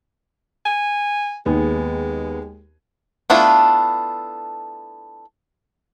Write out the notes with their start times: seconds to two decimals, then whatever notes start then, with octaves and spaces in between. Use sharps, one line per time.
0.66 G#5
1.46 D#2 G#3 B3 G#4
3.30 A3 B3 D4 E4 F4